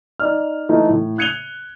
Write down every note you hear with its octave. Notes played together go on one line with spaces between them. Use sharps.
D#4 D5 F6
E3 A3 D#4
A2
F#6 G#6 C#7 D#7 F7 G7